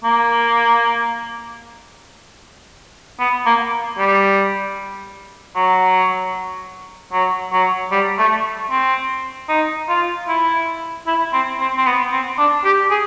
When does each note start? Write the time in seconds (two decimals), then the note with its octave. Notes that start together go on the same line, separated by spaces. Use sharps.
0.04 A#3
3.20 B3
3.46 A#3
3.98 G3
5.56 F#3
7.13 F#3
7.53 F#3
7.91 G3
8.18 A3
8.71 C4
9.49 D#4
9.89 F4
10.28 E4
11.07 E4
11.33 C4
11.60 C4
11.77 C4
11.86 B3
12.12 C4
12.38 D4
12.65 G4
12.90 G#4